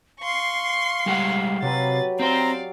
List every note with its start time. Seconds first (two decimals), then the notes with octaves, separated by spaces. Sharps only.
0.21 F5 C6 C#6
1.06 G3 G#3 F#5
1.62 C3 F#3 G4 B4 B5 A6
2.20 C4 C5 D5 F5 A#5